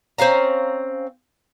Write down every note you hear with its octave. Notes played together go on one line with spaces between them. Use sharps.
C4 C#4 F5 A#5